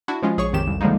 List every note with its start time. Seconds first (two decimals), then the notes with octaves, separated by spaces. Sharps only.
0.08 D4 E4 F#4
0.22 F3 G#3 C#4 F4
0.38 A#1 G#4 C#5 C#6
0.53 A#1 F2 D#3 G4 E7
0.67 C2 F2
0.81 D3 F3 G3 G#3 A#3 D#4